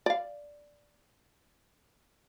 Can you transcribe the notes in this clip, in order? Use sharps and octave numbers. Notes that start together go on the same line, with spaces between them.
D5 F5